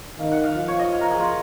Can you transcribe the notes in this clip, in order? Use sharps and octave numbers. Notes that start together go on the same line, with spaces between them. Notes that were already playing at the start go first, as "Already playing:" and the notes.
D#3 F5
F#5
F5
F3
C#5
D#5
F5
A#4
G#4
F4